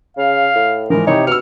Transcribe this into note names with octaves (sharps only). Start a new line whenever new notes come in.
C#3 F5
A2
G#2 E3 F3 A#4
C3 D#4 E4 G4 C#5
B2 E6 F6 C#7